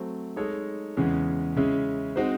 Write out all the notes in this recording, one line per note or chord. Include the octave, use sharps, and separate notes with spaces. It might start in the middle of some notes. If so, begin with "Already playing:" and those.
Already playing: F#3 A3 C4
G#3 D#4 A4 C#5
E2 C#3 E3 G#3 C#4
C#3 G#3 C#4 E4
G#3 C4 D#4 F#4 C5